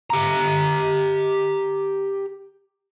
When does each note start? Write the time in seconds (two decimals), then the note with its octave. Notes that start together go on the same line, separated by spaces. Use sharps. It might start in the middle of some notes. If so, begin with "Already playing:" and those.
0.10 G4 A#5